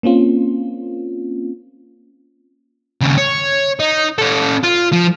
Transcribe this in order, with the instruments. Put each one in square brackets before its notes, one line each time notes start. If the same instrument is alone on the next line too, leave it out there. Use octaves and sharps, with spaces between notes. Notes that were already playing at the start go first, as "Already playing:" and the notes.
[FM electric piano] A#3 C4 C#4 F4
[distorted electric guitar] D#2 C#3
C#5
D#4
C#4 A4
F4
F3